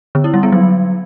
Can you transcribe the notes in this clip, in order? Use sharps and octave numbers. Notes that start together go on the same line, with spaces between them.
D3
E4
G3
B3
F#3